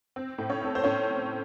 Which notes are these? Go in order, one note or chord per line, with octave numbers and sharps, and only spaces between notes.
C4
A2
C#4 C#5
C4 A4
C5
A2 C#4 C#5